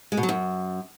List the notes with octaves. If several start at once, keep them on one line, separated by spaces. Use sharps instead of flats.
G#3
B2
F#3
F#2